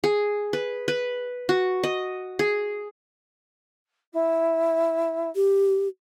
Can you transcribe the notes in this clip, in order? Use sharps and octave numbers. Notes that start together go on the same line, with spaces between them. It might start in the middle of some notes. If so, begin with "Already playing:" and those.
G#4
B4
B4
F#4
D#5
G#4
E4
G4